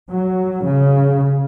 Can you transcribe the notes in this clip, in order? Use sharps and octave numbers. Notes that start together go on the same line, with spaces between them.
F#3
C#3